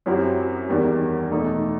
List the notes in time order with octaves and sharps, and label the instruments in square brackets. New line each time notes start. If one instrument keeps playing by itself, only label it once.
[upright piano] F#2 F#3 C4 E4 G4
E2 D#3 G3
E2 B2 A3 D#4 A4